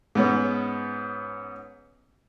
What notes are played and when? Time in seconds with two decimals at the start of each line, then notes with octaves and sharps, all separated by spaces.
0.15 G#2 B3 C#4